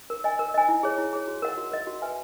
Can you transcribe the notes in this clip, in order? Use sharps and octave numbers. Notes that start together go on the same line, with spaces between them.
A#4
D#5 G#5
A#4
D#5 G#5
E4
G#4 C#5
E4
G#4 C#5
F#4
A#4 D#5 F#5
F#4
A#4 D#5 F#5
F#4
B4 E5 G#5